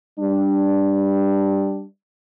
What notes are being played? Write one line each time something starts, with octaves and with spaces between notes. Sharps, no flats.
G3 D4